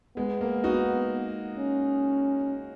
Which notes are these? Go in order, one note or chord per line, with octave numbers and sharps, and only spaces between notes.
G#3 B3
A#3
D#4 F#4
C#4